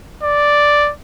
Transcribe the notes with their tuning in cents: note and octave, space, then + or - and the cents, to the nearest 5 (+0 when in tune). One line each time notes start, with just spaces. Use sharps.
D5 +0